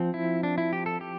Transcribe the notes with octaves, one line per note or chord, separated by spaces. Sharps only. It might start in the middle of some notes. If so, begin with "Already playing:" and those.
Already playing: F3 C4
E4
D4
E4
G4
A4
G4